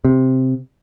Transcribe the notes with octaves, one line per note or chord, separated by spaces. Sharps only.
C3